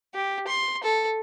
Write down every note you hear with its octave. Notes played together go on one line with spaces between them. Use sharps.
G4
C6
A4